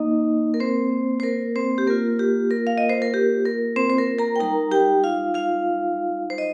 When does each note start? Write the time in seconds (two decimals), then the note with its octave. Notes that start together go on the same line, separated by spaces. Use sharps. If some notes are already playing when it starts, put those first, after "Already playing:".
Already playing: A#3 D#4 D#5
0.54 A#4
0.60 C4 C5
1.20 C5
1.23 A#4
1.56 C4 C5
1.78 G4
1.87 A#3 F4 A#4
2.19 G4
2.51 A#4
2.67 F5
2.78 D#5
2.89 C5
3.02 A#4
3.14 G4
3.46 A#4
3.76 C4 C5
3.90 C5
3.98 A#4
4.19 A#4 A#5
4.36 G5
4.40 G3 D#4 A#4 A#5
4.72 G4 G5
5.04 F4 F5
5.34 F4 F5
6.30 C5
6.38 D#5